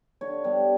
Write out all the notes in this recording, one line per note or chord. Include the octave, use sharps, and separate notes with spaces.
D3 C#5
G3 B3 D4